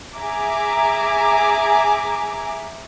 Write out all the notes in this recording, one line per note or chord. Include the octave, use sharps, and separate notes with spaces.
G#4 E5 G#5 A#5 D6